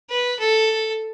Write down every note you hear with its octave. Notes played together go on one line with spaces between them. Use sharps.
B4
A4